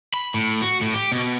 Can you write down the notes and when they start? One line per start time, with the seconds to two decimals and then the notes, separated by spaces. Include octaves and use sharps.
0.14 B5
0.34 A2
0.62 F#4
0.81 A2
0.94 G4
1.12 B2